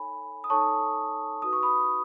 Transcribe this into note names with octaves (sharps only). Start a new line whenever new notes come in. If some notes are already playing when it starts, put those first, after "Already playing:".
Already playing: D#4 A4 C#5 G#5 B5
D#6
D#4 A4 C#5 A5 C#6
D#4 F#4 B4 D#6
C#6
B5 D#6